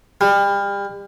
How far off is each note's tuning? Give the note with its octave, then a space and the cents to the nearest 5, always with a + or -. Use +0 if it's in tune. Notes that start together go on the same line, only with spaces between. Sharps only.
G3 +35